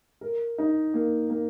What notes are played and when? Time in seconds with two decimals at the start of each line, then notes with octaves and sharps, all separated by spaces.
0.21 A#4
0.58 D#4
0.94 A#3
1.30 A#3